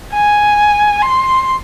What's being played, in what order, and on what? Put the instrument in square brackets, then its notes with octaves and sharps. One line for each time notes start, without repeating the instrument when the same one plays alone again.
[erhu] G#5
C6